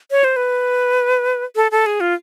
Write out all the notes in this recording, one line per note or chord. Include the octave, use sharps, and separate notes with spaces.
C#5
C5
B4
A4
A4
G#4
F4